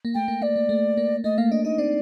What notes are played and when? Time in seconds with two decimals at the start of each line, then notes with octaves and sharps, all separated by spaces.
0.05 A#3
0.14 A3 G5
0.28 A#3
0.42 A#3 D5
0.56 A#3
0.69 A3
0.97 A#3
1.24 A3 D#5
1.38 A#3 F5
1.51 D4 D#5
1.65 D#4 D#5
1.78 C4 D5